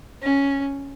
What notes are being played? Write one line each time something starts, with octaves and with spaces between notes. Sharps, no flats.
C#4